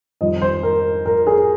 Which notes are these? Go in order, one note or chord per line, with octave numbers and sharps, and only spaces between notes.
F2 D#3 G3 D#5
C5
A#4
A#4
G#4